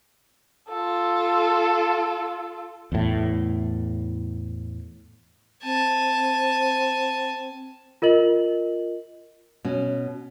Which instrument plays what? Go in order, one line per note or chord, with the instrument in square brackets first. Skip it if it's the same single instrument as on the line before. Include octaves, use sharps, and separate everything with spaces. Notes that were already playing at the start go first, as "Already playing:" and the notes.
[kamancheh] F4 A4
[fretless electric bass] E2 A2
[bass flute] C4 [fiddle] G#5 A5
[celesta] F4 A#4 D#5 F#7
[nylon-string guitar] B2 C#4